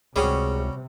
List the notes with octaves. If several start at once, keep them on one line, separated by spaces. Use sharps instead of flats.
C#2 C3 G3 C#4 F#4 G#4